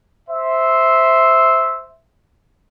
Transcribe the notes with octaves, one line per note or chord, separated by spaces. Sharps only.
C5 E5